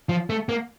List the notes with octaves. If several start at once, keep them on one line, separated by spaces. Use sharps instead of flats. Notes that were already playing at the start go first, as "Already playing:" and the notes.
F3
A3
A#3